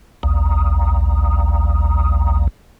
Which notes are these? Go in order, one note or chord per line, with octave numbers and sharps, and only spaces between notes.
A#1 D#2